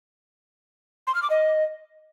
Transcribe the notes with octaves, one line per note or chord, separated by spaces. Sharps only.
C6
F6
D6
D#5